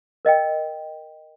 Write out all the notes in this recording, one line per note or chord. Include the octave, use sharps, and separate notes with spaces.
A#4 D#5 F5 G5